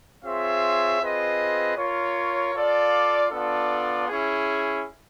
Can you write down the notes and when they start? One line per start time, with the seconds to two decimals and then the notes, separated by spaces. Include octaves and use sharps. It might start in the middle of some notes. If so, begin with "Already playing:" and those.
0.23 C4 F4 G#4 C#5 E5
1.00 C4 F4 G#4 B4 D#5
1.77 F4 A#4 C#5
2.54 F4 A4 D5 F5
3.30 B3 D4 F4 A4 D5
4.08 C#4 E4 G#4